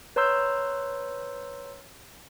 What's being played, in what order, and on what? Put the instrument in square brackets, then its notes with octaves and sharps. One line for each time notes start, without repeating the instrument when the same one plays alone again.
[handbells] B4 C#5 A#5 C6 E6 G6